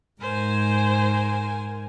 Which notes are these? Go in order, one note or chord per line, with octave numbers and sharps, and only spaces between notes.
G#2 A#4 C5 G#5